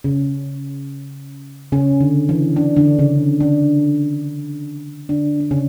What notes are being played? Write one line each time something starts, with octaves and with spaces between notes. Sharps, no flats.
C#3 C#4
C#3 C#4
D3
E3
D4
D3 D4
C#3 C#4
D3 D4
D3 D4
D4
C#3 C#4